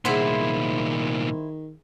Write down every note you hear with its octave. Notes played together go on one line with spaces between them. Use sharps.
C2 A#2 D#3 E4 G#4 C5 F#5